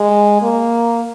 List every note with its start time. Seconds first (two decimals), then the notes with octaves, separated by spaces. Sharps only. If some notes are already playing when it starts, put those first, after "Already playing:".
Already playing: G#3
0.42 A#3